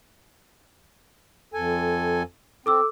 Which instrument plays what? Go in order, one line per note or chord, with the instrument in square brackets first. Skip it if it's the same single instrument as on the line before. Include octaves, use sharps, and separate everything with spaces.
[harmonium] F2 A4 G#5
[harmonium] C4 [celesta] A4 D6 E6